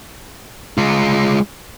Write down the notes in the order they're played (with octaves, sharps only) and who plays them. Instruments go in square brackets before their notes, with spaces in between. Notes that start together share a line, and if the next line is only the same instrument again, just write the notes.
[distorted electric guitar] G#3 F4